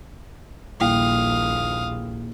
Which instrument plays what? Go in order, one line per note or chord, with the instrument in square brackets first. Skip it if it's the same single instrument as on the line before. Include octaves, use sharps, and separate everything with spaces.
[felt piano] D#1 E4 G5 [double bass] A#1 [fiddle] F5 D#6